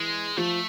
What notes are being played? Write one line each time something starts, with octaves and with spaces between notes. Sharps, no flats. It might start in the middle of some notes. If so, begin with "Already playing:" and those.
Already playing: E3 G#3
F3 A3